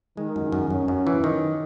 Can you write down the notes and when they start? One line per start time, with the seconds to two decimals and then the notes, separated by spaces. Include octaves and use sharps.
0.17 D#3 G#3
0.36 F#2
0.52 F#2
0.70 F#2 C#4
0.88 F#2
1.07 E3
1.24 D#3